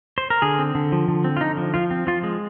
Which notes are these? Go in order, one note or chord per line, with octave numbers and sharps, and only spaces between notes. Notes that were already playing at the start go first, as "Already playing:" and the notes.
C5
A#4
D3 G#4
C4
D3
F3
D3
C4
F4
D3 D#4
F3
F3 F4
C4
F3 F4
G#3